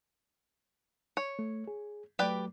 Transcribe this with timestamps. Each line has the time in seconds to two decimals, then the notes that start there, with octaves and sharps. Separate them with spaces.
1.17 C#5
1.39 A3
1.68 G#4
2.19 F#3 A3 G4 B4 D5